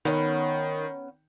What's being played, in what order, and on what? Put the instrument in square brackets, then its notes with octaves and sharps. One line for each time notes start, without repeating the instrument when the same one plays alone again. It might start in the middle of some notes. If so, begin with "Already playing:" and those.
[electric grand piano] D#3 [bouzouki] B3 C#4